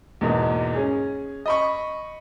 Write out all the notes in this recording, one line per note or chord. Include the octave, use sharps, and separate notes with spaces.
E2 G#2 B2 A#3
C#4 G#4
D#5 B5 C#6